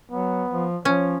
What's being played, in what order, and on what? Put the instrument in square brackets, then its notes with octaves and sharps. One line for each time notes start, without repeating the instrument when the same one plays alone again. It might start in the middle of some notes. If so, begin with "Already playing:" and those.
[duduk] F#3 [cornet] B3
[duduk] F3
[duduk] F3 [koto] C#4 [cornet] C#5